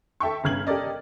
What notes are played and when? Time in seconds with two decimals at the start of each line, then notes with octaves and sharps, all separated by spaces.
0.20 A4 E5 G5 C#6
0.44 G1 C#3 F6 G#6 F#7
0.67 G4 A4 A#4 D5 D#5